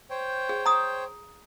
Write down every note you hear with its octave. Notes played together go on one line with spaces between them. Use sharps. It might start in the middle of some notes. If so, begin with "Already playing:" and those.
C5 C#5 G5
G#4
A#5 D#6